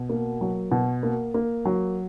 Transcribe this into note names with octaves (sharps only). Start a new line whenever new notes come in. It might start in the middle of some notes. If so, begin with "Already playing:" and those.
Already playing: B2
A#3
F#3
B2
A#3
A#3
F#3